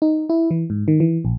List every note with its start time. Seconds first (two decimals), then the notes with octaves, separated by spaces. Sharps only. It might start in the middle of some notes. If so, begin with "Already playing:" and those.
0.02 D#4
0.29 E4
0.51 E3
0.70 G#2
0.88 D#3
1.00 E3
1.25 A#1